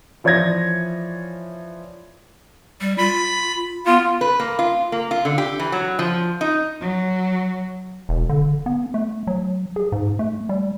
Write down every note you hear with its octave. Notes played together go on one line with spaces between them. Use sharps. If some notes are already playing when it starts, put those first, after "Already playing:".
E3 F3 C#5 D5 G#6 A#6
G3
F4 B5
B3 F4
B4
A#3
F4
A#3
F4
D3
G4
E3
F#3
F3
D#4
F#3
E1
D3
B3
A3
F#3
G#4
G#2
A3
G3